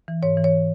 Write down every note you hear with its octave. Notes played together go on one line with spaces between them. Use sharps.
E3
G#2 C#5
E3
C#5